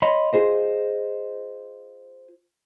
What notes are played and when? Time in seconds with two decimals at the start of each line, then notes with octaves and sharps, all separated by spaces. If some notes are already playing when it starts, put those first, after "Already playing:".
0.02 C#5 D#5 B5 C6
0.33 F4 G#4 C5 D#5